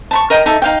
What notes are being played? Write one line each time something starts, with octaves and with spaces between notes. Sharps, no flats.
A5 B5 C#6
A#4 D#5 G5 A#5
D#4 A4 E5
D#4 F5 G5